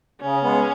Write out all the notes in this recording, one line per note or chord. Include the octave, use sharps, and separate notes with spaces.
C#3 C#4
G#3 B3